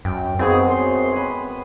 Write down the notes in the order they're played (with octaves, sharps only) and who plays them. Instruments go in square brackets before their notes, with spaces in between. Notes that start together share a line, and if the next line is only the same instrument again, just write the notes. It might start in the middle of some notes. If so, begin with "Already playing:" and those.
[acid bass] F#2 [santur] G5
[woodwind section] D#2 G#4 [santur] G#3 B3 F#4 [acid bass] C4
[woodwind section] F#2 C6
[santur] G#5 B5